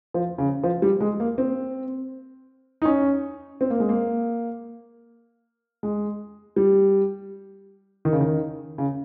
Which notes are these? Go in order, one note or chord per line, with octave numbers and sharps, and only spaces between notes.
F3
C#3
F3
G3
G#3
A#3
C4
D#4
C#4
C4
A#3
G#3
A#3
G#3
G3
D#3
C#3
D#3
C#3